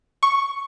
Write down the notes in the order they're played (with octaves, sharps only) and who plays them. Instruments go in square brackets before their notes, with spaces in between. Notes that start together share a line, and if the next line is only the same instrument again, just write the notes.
[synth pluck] C#6